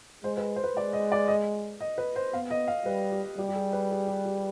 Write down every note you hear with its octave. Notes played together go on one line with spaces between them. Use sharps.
G#3 C5
B4
C5
B4
G#3 D5
D#5
D5
D#5
D#5
B4
C5
B3 F5
D#5
F5
G3 B4
G4
G3 G4
G4
G#4
B4
G#4
G4
G4